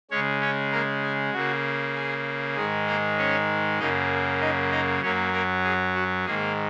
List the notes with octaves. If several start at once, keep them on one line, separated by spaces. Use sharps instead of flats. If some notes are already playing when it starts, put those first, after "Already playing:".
C#3 G#3 C#4 C#5
C#4 C#5
A#3 A#4
G#4
C#3 A#3 F#4
G#4
G#2 D#3 G#3 G#4
A#3 A#4
C#4 C#5
F#2 C#3 A#3 D#4 D#5
D#4 D#5
D#4 D#5
F#2 F#3 A#3 C#4 C#5
A#3 A#4
G#4
F#4
G#2 D#3 A#3 G#4